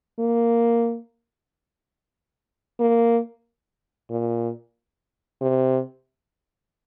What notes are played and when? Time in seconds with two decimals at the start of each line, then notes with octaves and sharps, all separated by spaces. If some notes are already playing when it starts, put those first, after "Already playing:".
0.19 A#3
2.80 A#3
4.10 A#2
5.41 C3